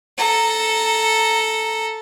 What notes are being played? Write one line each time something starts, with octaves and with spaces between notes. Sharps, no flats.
A4 A#5